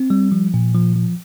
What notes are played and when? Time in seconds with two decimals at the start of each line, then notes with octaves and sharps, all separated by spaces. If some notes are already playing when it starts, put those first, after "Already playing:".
Already playing: C4
0.10 G3
0.32 F3
0.54 A#2
0.75 F3
0.96 F3